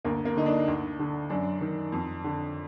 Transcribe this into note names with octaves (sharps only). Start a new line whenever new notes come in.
D2 A#3
A#3
D3 D#4
D4
D2
D3
F#2 D4
D#3
F2
D3